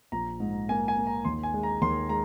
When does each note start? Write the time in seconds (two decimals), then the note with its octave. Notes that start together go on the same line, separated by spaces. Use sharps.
0.12 A#1 A#5
0.40 G#2
0.69 A#3 G#5
0.88 G#5
0.97 A#3
1.07 A#5
1.25 D#2 C6
1.43 G#5
1.54 G#3
1.63 A#5
1.81 D#2 C6
2.09 G#3 A#5